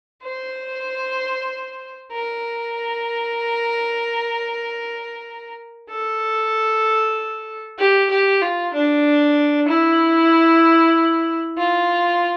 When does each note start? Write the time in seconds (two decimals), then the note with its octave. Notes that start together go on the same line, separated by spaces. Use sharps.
0.23 C5
2.12 A#4
5.89 A4
7.79 G4
8.10 G4
8.42 F4
8.74 D4
9.68 E4
11.57 F4